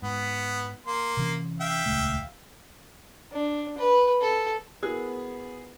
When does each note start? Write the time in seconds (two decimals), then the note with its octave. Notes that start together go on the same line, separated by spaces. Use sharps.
0.02 G#2 B3
0.87 A#3 C6
1.17 C3 E3 C#4
1.60 E5 F5 G5
1.86 D#1 C#2 A3
3.33 D4
3.78 B4
4.21 A4
4.83 B3 E4 F#4 G#4 A#4